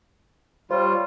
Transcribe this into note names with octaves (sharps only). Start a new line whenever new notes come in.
G3 F4 C5 C#5